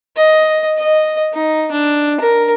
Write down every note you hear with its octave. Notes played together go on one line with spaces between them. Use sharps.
D#5
D#5
D#4
D4
A#4